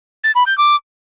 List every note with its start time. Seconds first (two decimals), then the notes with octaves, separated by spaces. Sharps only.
0.24 A6
0.35 B5
0.47 G6
0.58 D6